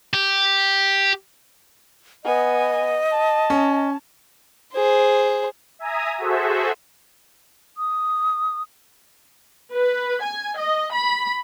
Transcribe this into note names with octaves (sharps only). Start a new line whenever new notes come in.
G4
B3 D#5 G#5
A5
C#4
G#4 C5
E5 G#5 A#5 D#6
F#4 G#4 A4 C5 E5
D#6
B4
G#5
D#5
B5